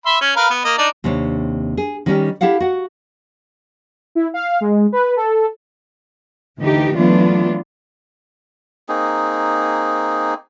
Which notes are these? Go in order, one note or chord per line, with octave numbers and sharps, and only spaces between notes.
E5 B5 C6
C#4
A#4 B4 F5
B3
A#3 D#5
D4 D#4 D5
D#2 C3 C4 D4 C#5
G#4
D#3 G3 B3 C#4 D#4 G4
E4 G4 A4 F5 F#5
F#4 F#5
E4
F5
G#3
B4
A4
D2 E3 D#4 G4
E3 F#3 A3 B3 D4 F4
A#3 C4 D#4 G#4